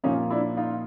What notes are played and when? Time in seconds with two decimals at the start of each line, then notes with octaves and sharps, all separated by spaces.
0.04 A#2 F3 A#3 C#4 D#4
0.30 D4 E4
0.57 D#4 F4